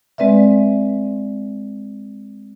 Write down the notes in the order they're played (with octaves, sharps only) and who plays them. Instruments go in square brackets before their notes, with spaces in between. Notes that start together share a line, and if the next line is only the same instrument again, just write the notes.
[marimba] G#3 C4 B4 D5 E5